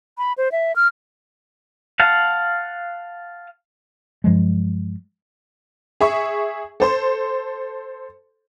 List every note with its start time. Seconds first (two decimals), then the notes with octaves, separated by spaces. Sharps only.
0.18 B5
0.38 C5
0.52 E5
0.76 F6
2.00 F5 F#5 A5
4.24 G2 F3 F#3 G#3
6.01 G#4 E5 C#6
6.80 A4 C5 C6